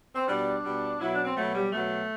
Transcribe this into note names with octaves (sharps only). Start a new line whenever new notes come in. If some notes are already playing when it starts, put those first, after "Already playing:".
C4
B2 G3 D4
B2 G3
B2 F#3 E4
D4
C4
B2 F#3 A3
G3
B2 F#3 A3